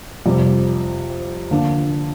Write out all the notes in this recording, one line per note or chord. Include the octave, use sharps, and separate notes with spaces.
F2 C3 G3
D3 F3 A#3 D4